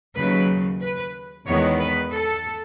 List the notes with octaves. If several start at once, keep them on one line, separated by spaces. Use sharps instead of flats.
D#2 C#3 F#3 B4
B4
E2 D#3 G#3 B3 C#5
B4
A4